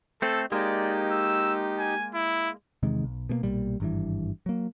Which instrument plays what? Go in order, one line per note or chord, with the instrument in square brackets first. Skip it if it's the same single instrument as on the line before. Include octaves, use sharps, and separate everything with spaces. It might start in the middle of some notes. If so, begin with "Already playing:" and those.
[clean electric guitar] A3 C4 [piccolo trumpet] A4
[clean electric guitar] G#3 A#3 [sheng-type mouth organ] D#4 G4 [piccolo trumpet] D5
[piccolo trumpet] E6
G#5
E4
[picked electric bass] E2 C3 D#3 G#3
B1
B2 G3 A#3
B1 A#2 G3
G#1 G2 E3
F#3 A#3